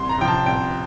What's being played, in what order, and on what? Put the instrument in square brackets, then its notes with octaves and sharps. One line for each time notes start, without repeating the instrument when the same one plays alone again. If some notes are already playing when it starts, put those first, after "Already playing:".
Already playing: [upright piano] C2 C6
A#5
C3 F3 G5
A5
C2 G5